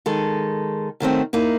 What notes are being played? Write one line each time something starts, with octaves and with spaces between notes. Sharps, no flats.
D#3 G#3 A4
F#2 D#3 A3 C4
A#3 D#4 E4